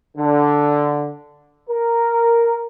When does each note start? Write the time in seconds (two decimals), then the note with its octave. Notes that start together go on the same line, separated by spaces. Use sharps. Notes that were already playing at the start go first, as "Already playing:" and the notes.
0.18 D3
1.69 A#4